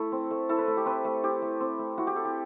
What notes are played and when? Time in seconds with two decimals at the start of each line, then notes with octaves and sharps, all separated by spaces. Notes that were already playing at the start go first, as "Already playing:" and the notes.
Already playing: A3 E4 A4
0.12 C4
0.31 A3
0.49 E4 A4
0.59 B4
0.67 A3
0.77 G4
0.86 C4 B4
1.05 A3
1.24 E4 G4
1.42 A3
1.61 C4
1.79 A3
1.98 E4 F#4
2.07 G4
2.16 A3 A4
2.25 G4